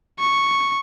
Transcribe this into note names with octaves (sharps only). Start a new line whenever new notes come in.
C#6